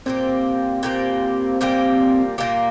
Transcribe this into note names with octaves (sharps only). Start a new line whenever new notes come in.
A#2 G3 A#3 C4 G4
A#2 G3 A#3 G4
A#2 G3 A#3 G4
A#2 G3 A#3 G4